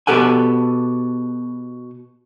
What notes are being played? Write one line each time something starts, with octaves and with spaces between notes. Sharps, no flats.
B2 G4 A4 F#5 G#5